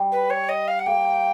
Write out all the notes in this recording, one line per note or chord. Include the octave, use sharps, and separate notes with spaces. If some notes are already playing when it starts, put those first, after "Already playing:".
Already playing: G3
B4
C#5
D#5
F5
F#5
A#3 G5